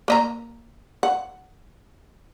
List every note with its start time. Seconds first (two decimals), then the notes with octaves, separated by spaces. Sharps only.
0.08 A#3 D#5 A#5
1.03 F#5